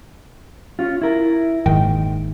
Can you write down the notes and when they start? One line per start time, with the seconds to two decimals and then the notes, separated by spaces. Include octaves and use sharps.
0.79 C#4 F4
1.01 E4 A#4
1.66 F#1 G#2 D#3 G5